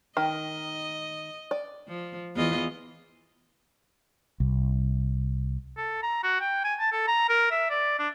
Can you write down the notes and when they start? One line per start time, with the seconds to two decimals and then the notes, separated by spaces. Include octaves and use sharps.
0.17 D#3 D#5
1.51 D5
1.88 F3
2.36 E2 F4 D#5
4.40 C2
5.77 A4
6.03 A#5
6.23 F#4
6.40 G5
6.64 G#5
6.79 A5
6.92 A4
7.07 A#5
7.29 A#4
7.51 E5
7.70 D5
7.99 D4